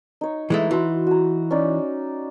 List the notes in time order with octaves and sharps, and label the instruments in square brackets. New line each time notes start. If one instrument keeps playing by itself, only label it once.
[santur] D#4 C#5
[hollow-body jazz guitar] E3 G#3 A3
[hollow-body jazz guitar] E3 [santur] F#4 C6
[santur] F#4 A#5
C#4 D#4 D5